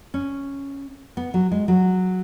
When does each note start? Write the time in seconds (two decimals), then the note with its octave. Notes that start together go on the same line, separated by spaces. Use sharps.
0.14 C#4
1.17 B3
1.34 F#3
1.51 G#3
1.68 F#3